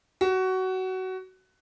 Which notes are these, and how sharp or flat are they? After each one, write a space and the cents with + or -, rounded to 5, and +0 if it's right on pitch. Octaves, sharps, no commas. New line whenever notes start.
F#4 +20